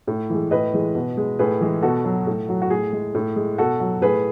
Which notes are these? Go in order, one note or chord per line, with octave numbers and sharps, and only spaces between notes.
A2
E3 G#3
A2 B4 D#5
E3 G#3
B2
G#3
A2 G#4 B4
E3 G#3
B2 F#4 A4
F#3
A2
F#3
F#4
A2 G#4
G#3
A2
G#3
B2 F#4 A4
F#3
A2 G#4 B4